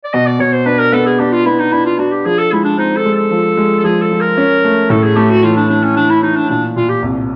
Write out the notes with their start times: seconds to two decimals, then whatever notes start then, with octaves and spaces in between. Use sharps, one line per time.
0.04 D5
0.13 B2 D#5
0.27 D5
0.39 B2 C#5
0.53 C5
0.66 D4 B4
0.79 A#4
0.93 B3 A4
1.06 G#4
1.19 D4 G4
1.32 F4
1.46 B3 E4
1.59 D#4
1.72 D4 E4
1.86 F4
1.99 D4 F#4
2.12 G4
2.25 F3 G#4
2.39 A4
2.52 G#3 E4
2.65 D4
2.78 C4 D#4
2.97 A4
3.05 G#3
3.14 A4
3.31 F3
3.57 G#3
3.79 A4
3.84 F3 G#4
4.02 A4
4.12 F3
4.20 A#4
4.37 C#4
4.65 A3
4.90 A2 A4
5.03 G#4
5.16 A3 G4
5.30 F#4
5.43 E3 F4
5.57 D4
5.70 A3 D4
5.83 C#4
5.97 E3 D4
6.10 E4
6.23 E3 D#4
6.36 D4
6.50 A#2 D4
6.76 A#2 F4
6.89 G4
7.02 C2